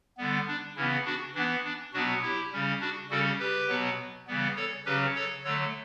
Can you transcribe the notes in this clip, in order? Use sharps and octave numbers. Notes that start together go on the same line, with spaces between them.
D3 G3 B3
D4
C#3 E3 B3 C#4 E4
D4 F#4
E3 B3 D4
D4
B2 F#3 B3 D4 F#4
E4 G4
C#3 G3 C#4
D4 F#4
C#3 G3 C#4 F#4 A4
G4 B4
B2 F#3 B3
C#3 E3 G3 B3
A4 C#5
C#3 F#3 C#4 G4 B4
A4 C#5
D3 F#3 A3 A4 C#5